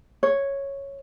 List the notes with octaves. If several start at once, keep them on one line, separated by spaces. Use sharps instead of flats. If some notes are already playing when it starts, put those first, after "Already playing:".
C#5